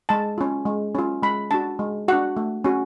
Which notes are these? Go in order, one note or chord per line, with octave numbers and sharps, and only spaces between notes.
G#3 A5
C#4 F4
G#3
C#4 F4
G#3 B5
D4 F#4 A5
G#3
D4 F#4 F#5
A3
C#4 F#4